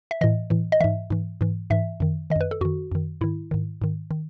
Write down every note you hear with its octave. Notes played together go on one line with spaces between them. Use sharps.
E5
A2 E3 D#5
A2 E3
D#5
G#2 E3 E5
G#2 E3
G#2 E3
G#2 E3 E5
F#2 D#3
D#3 D#5
F#2 B4
A4
F#2 D#3 F#4
F#2 D#3
G#2 D#3 E4
G#2 D#3
G#2 D#3
D#3